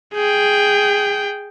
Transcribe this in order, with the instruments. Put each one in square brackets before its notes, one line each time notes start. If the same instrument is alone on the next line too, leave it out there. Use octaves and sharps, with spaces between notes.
[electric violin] G#4 G5